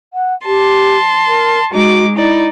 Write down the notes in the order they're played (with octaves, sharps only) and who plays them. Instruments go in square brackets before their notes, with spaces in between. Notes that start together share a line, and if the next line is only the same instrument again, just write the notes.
[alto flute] F#5
[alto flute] G4 [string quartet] A5 C6
[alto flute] A#4
[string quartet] G#3 D#4 D6 [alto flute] F#4
[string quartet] D#4 D5 [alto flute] E4